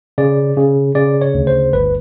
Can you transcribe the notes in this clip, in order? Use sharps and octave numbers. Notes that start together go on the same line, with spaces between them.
C#3 D5
C#3
C#3 D5
C#5
D2
C5
G1 B4